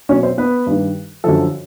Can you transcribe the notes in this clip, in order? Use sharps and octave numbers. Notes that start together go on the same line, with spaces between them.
B2 F#3 C#4 C#5
C4 C5
B3 B4
G2 D#3 G3
F#2 D3 F3 A4